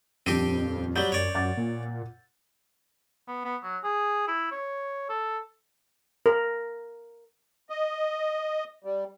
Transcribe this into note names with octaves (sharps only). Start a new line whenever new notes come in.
D#1 F2 C4 D4 G4 D#7
F#3 G3 G6
F#2 C#5 D5
F#2 F#5 D6 A6
A#2
B3
B3
F#3
G#4
E4
C#5
A4
A#4
D#5
G3